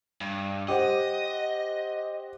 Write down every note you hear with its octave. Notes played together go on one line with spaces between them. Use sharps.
G2
G4 C5 D#5 F#5